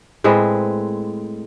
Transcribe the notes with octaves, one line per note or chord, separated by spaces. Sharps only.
A2 G#3 C4 B4